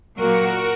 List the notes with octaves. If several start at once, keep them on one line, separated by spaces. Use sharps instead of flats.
A#2 F#3 A#3 F#4 A#4